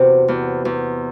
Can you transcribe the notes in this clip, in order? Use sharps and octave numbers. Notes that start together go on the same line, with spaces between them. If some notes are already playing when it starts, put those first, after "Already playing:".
Already playing: E2 C3 F#4
E2
E2